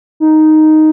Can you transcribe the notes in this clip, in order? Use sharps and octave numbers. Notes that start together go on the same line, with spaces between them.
D#4